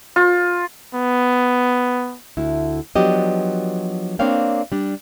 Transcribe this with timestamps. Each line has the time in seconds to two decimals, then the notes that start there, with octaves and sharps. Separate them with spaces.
0.16 F4
0.94 B3
2.37 D2 E4
2.96 F3 F#3 B3 D4 G4 D#5
4.19 A#3 C4 D4 C#5 F5 G5
4.72 G3 D4